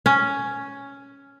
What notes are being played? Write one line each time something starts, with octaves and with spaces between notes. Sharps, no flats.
C#4